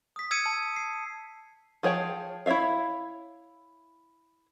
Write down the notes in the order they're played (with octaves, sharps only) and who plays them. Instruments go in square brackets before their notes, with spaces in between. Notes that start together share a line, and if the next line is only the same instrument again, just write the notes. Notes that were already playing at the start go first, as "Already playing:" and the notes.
[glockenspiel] D#6 B6
D#6 E6 G#6 B6 C#7 D#7
A5
C7
[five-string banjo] F3 G#4 C#5 G5 A5
E4 C#5 D5 E5 F5